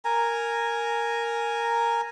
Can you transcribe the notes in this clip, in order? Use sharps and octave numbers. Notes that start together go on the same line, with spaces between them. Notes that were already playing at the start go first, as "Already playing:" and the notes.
A#4 G#5 A#5